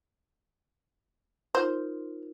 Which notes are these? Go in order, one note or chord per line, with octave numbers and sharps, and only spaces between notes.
D#4 F4 A#4 C5